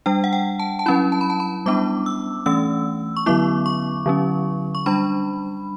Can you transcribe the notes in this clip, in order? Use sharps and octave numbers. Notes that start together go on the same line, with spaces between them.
G3 D4 G5
F#5
G5
A5
A5
F#3 C#4 E4 B5
A5
B5
A5
B5
G3 B3 D4 D6
E6
E3 A3 C#4 E6
C#6
D3 F#3 B3 E4 D6
C#6
D3 F#3 C#4
C#6
G3 D4 B5